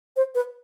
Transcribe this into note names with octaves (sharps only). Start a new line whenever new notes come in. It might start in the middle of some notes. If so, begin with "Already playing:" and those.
C5
B4